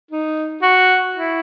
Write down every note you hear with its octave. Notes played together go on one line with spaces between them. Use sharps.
D#4
F#4
E4